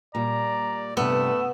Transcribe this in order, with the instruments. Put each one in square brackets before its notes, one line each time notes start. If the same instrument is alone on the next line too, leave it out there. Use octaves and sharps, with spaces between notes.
[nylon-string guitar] A#2 G3 [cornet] D5 [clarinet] A#5
[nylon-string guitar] G2 C3 [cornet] A3 [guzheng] B3 [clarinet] E6